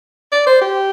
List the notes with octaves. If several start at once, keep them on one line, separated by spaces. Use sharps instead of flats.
D5
C5
G4